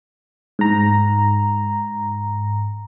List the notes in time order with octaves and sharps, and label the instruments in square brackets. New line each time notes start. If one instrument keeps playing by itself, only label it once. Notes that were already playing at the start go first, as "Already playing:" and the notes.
[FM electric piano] G#2 A#5